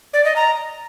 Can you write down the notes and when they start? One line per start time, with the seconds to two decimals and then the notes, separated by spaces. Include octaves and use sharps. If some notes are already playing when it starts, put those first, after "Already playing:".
0.13 D5
0.25 D#5
0.36 A#5